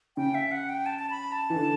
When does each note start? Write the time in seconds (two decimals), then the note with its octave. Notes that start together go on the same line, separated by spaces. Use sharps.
0.17 C#3 G5
0.34 E5
0.51 F#5
0.69 G5
0.86 A5
0.99 A5
1.10 B5
1.32 A5
1.50 E3
1.56 D3